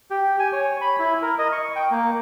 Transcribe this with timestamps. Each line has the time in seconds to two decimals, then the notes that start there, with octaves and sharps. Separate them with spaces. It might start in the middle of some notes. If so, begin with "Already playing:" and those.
0.11 G4
0.40 G#5
0.53 C#5
0.81 B5
0.99 E4
1.22 A#4
1.38 D#5
1.52 C#6
1.76 G5
1.91 A#3